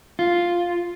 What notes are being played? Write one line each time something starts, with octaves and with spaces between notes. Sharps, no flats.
F4